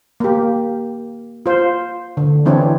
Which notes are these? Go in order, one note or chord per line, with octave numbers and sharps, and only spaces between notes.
A#3 G4
F4 C5
D3
E3 C4 D4 E4 C#5